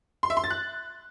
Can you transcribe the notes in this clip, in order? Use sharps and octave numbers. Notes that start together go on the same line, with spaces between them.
C6
E5
C6
A6
F#6